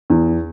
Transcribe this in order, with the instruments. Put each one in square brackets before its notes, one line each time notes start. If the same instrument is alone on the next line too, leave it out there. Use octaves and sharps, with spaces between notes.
[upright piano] E2